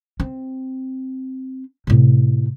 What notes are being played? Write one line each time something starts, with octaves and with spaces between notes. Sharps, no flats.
C4
A2 C3